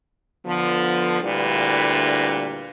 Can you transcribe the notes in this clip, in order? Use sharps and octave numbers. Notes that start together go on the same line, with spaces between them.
D3 F3 B3
D2 A#2 D3 G3 E4 B4